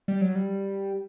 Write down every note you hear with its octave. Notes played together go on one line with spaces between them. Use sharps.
G3
F#3
G3